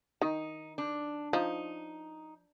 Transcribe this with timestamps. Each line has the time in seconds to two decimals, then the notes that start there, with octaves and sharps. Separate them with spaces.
0.21 D#3 D#4
0.78 D4
1.33 F3 D#4